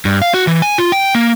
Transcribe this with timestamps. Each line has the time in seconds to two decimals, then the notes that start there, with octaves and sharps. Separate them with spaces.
0.05 G2
0.22 F5
0.34 F#4
0.47 E3
0.62 G#5
0.78 F4
0.92 G5
1.15 A#3